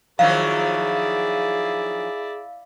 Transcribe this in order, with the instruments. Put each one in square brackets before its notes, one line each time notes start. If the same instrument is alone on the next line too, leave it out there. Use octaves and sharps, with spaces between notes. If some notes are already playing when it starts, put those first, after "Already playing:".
[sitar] D#3 F3 F#3 [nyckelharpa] E4 D5 [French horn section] G#4 [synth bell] F5